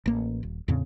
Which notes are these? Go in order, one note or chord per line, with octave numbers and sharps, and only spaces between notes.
A1 A#3
D#1
E2 A2 C#3 C4